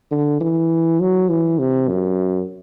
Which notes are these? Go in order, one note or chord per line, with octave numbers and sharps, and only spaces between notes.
D3
E3
F#3
E3
C3
F#2